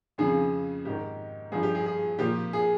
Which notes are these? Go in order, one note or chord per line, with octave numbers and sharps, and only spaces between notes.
F2 C#3 F3 G#4
G#2 D#3 G4
G2 F3 G#4
G4
G#4
G#4
A#2 F3 G4
G#4